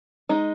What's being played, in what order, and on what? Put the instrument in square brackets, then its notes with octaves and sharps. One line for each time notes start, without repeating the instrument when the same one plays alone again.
[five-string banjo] G#3 D#4